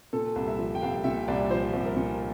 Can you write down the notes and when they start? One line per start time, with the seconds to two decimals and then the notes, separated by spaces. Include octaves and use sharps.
0.13 A#2 A4
0.36 C2
0.48 E5
0.59 F3
0.75 G5
0.82 C2 F5
1.04 A#2 E5
1.28 C2 D5
1.50 F3 C5
1.73 C2
1.85 A#4
1.96 A#2